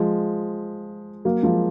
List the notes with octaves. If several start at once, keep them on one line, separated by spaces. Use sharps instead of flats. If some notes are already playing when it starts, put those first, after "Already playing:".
Already playing: F3 G#3
F#3 A#3
F3 G#3